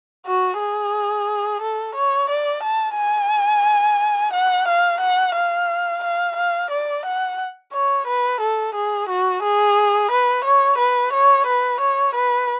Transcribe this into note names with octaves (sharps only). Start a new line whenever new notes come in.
F#4
G#4
A4
C#5
D5
A5
G#5
F#5
F5
F#5
F5
F5
F5
D5
F#5
C#5
B4
A4
G#4
F#4
G#4
B4
C#5
B4
C#5
B4
C#5
B4